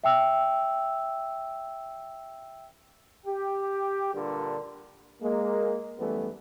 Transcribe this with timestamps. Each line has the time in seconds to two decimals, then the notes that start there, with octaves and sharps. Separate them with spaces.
0.04 E5 G5 E6
3.26 G4
4.13 G2 A#2 D3
5.22 G#3 A#3
5.99 F#2 E3 G3 A3 B3